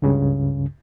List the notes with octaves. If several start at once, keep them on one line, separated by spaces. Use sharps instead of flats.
C#2 G2 C#3